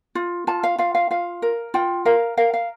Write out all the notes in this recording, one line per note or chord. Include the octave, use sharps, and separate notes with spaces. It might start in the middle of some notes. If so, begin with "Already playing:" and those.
F4
F4 A5
F5
F4 F5
F5
F4 F5
A#4
F4 G5
A#4 F5
A#4 F5
F5